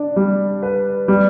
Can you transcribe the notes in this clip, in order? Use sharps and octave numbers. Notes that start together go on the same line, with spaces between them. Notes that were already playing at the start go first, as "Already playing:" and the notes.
Already playing: D4
G3
B4
G3